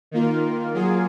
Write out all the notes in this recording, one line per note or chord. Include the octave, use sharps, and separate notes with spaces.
D#3 A#3 F4
F#3 A#3 F4 G#4